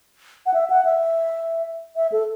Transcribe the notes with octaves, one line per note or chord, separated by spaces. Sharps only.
F#5
E5
F#5
E5
E5
A4